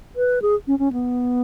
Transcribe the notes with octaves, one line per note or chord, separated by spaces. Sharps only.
B4
G#4
C#4
C#4
B3